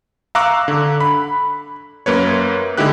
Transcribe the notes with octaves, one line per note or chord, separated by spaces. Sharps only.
F5 A#5 C#6 D6 E6 F#6
D3
B5
F#2 A#3 B4 C#5
D3 G#3 D#4 E4 G4 F#6